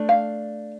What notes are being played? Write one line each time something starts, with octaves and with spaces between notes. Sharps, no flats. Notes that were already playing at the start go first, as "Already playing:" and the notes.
Already playing: A3 D4
F5